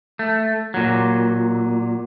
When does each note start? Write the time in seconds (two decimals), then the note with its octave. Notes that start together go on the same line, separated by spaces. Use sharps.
0.19 A3
0.74 A#2 F#3